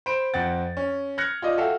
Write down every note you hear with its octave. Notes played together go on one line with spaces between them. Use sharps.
C5 B5 D7
F2 C4 F#5 A6
C#4
F6 F#6 G#6 A#6 C#7
F4 D5 D#5
F#4 A4 E5 F5 G5